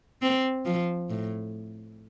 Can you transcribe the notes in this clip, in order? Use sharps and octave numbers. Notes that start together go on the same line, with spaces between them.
C4
F3
A2